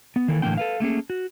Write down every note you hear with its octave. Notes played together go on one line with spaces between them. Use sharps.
B3
D#3 E3 A#3 A4
A2 D3 E3 A#3 C4 G5
A4 B4 F5
A3 A#3 C#4 G#4
F#4